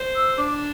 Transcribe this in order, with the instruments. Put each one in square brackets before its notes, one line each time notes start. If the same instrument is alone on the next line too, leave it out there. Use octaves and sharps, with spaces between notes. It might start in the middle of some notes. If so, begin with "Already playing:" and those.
Already playing: [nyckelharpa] C5
[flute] E6
[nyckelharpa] D4 [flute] D6